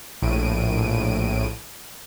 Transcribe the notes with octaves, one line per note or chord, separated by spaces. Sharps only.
A#1 A2 D7 D#7